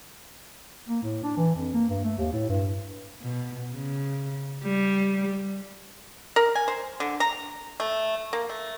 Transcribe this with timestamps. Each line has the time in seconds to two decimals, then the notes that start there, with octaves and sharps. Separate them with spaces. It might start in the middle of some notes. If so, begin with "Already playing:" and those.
0.88 A#3
1.03 A2
1.23 D4
1.37 E3
1.55 F2
1.74 A#3
1.89 G2
2.04 A3
2.18 D#2
2.33 A2
2.49 G2
3.22 B2
3.74 C#3
4.64 G3
6.36 A#4
6.55 G#5
6.68 C5
7.00 D3
7.20 A#5
7.80 A3
8.33 A#3
8.49 A3